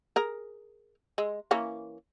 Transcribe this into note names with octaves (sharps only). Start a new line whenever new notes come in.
G#4 A#4
G#3
E3 A#3 C#4